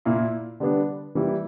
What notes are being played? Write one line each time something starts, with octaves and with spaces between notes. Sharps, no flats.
A#2 A#3 E4
D3 G3 B3 D4
E3 G3 A#3 E4